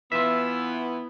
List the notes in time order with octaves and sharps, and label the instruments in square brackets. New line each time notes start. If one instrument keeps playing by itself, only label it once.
[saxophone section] E3 B3 [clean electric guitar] F4 E5